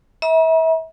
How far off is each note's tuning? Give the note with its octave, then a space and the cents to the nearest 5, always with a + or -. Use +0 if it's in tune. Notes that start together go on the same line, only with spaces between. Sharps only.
E5 -30 A#5 +45